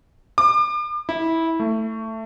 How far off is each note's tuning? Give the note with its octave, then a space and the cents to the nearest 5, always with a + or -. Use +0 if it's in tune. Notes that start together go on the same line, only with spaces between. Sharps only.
D6 +40
E4 -15
A3 +15